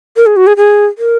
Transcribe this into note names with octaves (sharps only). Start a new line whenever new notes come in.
A#4
G#4
F#4
G#4
G#4
A#4